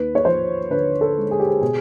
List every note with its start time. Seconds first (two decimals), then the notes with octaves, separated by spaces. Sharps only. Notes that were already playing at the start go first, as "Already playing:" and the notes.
Already playing: D#2 B4
0.15 C#5
0.25 F3 C5
0.70 D3 B4
1.01 A4
1.17 G#3
1.31 G#4
1.39 G4
1.47 G#4
1.62 B2 G#4